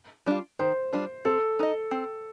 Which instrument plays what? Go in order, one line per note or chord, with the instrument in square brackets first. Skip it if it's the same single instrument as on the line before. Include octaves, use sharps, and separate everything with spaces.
[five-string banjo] G3 D4 F4
[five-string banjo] D#3 [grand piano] C5
[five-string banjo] G3 D4 F4
[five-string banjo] C4 [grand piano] A4
[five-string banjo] D#4 A#4
D#5
C4